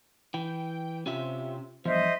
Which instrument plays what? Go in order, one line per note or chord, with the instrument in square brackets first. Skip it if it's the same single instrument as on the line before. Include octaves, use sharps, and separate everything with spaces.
[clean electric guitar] E3 [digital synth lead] G5
[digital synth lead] C3 [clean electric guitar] C#4 F4 E5
[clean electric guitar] E2 G2 [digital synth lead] F3 [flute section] C5 D#5 E5